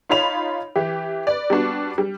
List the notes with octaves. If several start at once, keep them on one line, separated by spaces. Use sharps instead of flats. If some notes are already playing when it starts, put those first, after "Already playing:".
D#4 F4 C#5 F5 B5 F7
E3 G4
B4 D5
G3 B3 D4 F#4
G3